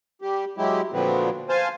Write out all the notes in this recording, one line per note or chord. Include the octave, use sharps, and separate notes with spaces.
G3 G4
F#3 G#3 E4 G4
A#2 D3 F3 F#3 B3 C4
C5 F5 G#5 A5